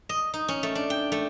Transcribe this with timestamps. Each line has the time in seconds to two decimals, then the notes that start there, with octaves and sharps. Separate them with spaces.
0.09 D#5
0.34 D#4
0.48 C#4
0.63 A3
0.75 D4
0.90 G5
1.12 A3